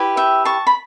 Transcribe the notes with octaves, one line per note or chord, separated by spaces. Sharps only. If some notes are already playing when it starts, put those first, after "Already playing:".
Already playing: E4 G4 B4
E5 G5
A5 C#6
B5